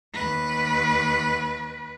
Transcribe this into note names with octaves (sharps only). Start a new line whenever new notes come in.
D#2 B4